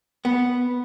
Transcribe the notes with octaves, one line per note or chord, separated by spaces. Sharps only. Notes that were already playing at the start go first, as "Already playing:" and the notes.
B3